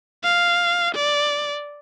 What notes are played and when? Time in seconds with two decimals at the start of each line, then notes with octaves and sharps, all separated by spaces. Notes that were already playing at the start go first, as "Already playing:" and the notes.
0.24 F5
0.95 D5